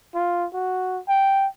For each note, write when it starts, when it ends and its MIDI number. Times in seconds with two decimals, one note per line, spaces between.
0.15 0.47 65
0.54 1.00 66
1.08 1.47 79